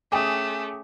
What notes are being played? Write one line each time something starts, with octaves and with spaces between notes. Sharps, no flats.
A3 C#4 G#4 G5 G#5 D6 D#6